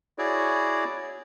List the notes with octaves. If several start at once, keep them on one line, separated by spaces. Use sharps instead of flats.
E4 F#4 G#4 C#5 D5